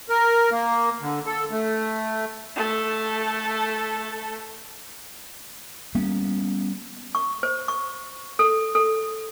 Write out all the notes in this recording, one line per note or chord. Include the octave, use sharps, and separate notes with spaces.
A#4
A#3
D3
A4
A3
A3 A4
G3 A#3 B3 C#4
C#6
C5
C#6
A4
A4